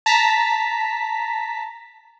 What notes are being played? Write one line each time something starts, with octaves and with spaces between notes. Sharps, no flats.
A5 A#5 B6